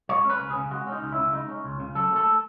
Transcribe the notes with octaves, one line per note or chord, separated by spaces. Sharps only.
G#3 C#5
C#4 B4
C#2
G#4
C#3
G#3 F#4
C#4
D#4
C#2
E4
C#3
G#3 D#4
C#4
C#2
C#3
F#3 A4
A3 A4